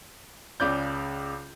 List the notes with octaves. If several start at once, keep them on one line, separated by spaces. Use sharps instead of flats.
C#2 C#3 D5 G6